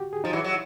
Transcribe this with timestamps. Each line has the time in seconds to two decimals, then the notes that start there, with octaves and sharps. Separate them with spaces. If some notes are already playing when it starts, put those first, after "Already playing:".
Already playing: F#4 G4
0.13 G#4
0.24 F3 D#4
0.33 E3 F#3 E4
0.44 F#3